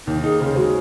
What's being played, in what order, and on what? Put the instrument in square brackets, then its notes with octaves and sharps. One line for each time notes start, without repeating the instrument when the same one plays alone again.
[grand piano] D#2 [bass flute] D#4
[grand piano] D#4 [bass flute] G#4
[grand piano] C#3 [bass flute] C5
[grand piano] G#3 [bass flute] F#4